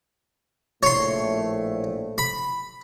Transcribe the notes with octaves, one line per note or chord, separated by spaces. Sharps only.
A#1 A2 A3 C#5 C6
B5